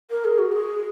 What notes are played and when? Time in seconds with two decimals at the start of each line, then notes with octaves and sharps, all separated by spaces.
0.11 A#4
0.25 G#4
0.38 F#4
0.52 G#4